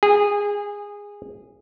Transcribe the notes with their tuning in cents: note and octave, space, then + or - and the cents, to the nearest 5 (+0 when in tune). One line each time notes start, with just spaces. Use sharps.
G#4 -20 G#5 -35